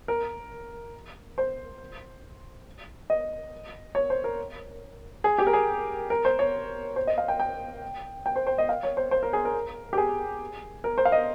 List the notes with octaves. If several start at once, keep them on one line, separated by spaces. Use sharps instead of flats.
A#4
C5
D#5
C#5
C5
A#4
G#4
G4
A#4
G#4
A#4
C5
C#5
C5
D#5
F5
G5
G5
G5
C5
C5
D#5
F5
C#5
C5
C5
A#4
G#4
A#4
G4
G#4
A#4
C5
F5
D#5